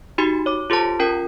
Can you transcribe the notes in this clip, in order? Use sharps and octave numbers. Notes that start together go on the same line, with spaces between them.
D#4 F#4 G4 B5
C#5 D6
F4 G4 A4 C5 A5
C#4 F4 A#4 G5